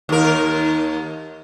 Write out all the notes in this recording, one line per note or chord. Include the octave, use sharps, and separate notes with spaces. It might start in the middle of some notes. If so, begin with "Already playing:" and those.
D#2 A#4